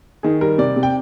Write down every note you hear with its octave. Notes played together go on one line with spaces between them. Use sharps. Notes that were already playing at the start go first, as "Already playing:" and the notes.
D#3 G#4
G3 A#4
C3 D5
C3
G5